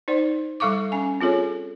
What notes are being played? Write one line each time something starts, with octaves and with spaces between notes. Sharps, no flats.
D#4 C5 D5
G3 A4 F5 C#6 D6
C#4 G#5
C4 F4 G#4 A4 C#5